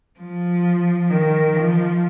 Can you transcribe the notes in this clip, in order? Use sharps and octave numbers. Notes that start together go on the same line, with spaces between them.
F3
D#3
F3